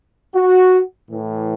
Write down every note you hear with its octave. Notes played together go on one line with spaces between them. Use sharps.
F#4
A2 E3